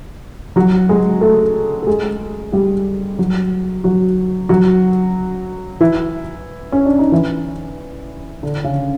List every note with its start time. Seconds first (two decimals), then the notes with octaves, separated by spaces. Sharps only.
0.56 F#3 F#4
0.89 G#3 G#4
1.21 A3 A4
1.82 A4
1.87 G#3 G#4
2.52 G3 G4
3.19 F#3 F#4
3.84 F#3 F#4
4.49 F#3 F#4
5.80 E3 E4
6.72 C#4
6.85 D4
6.99 D#4
7.12 E3 E4
8.43 D3 D4
8.64 C#3 C#4